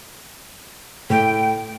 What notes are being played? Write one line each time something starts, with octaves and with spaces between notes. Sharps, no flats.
A2 G5